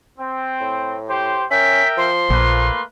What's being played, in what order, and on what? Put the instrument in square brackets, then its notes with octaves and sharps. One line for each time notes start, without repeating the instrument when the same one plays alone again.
[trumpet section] C4
[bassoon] A2
[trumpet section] G4 C5
[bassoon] C#4 [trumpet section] A#4 E5 G5 [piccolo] B6
[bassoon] F3 [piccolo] C6
[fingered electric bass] A#1 [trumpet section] A3 A#3 B4